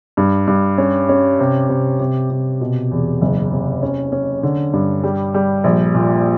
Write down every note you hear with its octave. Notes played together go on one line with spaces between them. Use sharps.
G2
G2
C#4
C#4
C3
C3
C3
C3
B2
E2
F#1
C3
C#4
C#4
D3
G2
G3
G3
A#1
A#2